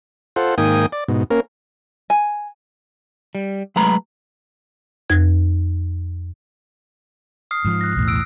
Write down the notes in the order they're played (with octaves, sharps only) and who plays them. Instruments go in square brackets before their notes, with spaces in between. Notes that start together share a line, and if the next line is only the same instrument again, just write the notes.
[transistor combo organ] F4 A4 C5 F#5
G#2 D#3 A#3 G5 G#5 D#6
D5
G#2 B2
A#3 C#4 A#4
[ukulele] G#5
[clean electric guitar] G3
F#3 G#3 A3 B4 A#5 B5
[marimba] F2 G#6
[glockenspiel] D#6 F6 C7
[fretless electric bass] G#2 F3
[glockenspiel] F#6 A#6
[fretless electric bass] B1 E2 A2
[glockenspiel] E6 D7